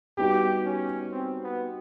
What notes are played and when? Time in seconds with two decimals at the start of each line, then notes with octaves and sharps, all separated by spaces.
0.17 G3 B3 D#4 F#4 G4
0.65 C#4
1.11 C4
1.44 B3